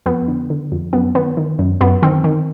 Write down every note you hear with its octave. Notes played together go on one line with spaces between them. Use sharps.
F2 B3
D3
D3
F2
F#2 B3
D#3 B3
D#3
F#2
F#2 B3
D#3 C4
D#3